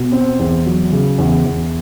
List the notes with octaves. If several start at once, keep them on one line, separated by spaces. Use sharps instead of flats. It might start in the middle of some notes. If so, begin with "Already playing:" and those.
Already playing: B2
C4
E2
F#3
C#3
E2
E2